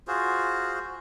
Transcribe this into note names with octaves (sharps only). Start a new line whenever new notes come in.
F4 F#4 G#4 C5